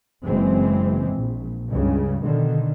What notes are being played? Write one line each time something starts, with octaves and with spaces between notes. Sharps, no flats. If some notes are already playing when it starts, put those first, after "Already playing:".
F#1 E3 G#3 C4
A#1
C#2 G2 C#3
B2 D3 D#3